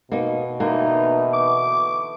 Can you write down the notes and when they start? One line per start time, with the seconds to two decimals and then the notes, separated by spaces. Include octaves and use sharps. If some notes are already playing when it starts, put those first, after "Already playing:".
0.12 B2 A#3 D#4
0.60 D3 E3 A#3 D#4
1.33 D6